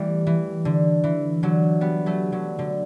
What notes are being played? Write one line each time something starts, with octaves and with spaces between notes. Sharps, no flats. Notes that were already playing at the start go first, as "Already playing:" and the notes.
Already playing: E3 G3 A3 B3
E3
D3
E3
D3 F#3
G3 B3
F#3 A3
D3 F#3
D3